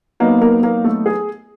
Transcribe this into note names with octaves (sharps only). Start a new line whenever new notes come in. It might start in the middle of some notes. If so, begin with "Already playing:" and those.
F#3 A#3 B3 D#4 A#4
A#3 A#4
A#3 A#4
A3 A4
G#4